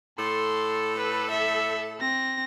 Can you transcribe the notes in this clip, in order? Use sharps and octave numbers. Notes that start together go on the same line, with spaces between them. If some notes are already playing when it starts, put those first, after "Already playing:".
A2 A4 C6
B4
E5
C4 A#6